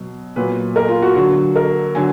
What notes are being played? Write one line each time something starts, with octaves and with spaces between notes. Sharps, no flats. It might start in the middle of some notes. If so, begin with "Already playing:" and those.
Already playing: B2 F#3
A#2 F#3 B4
A#4
F4
F#4
D3 F#3 F#4
A#4
D3 F#3 G#5